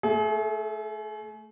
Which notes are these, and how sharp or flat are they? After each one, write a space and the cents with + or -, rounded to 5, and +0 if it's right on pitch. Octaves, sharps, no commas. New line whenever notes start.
A3 +0 G#4 +40